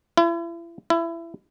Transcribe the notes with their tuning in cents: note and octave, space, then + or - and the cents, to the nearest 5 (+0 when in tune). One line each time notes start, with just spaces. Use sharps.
E4 +40
E4 +25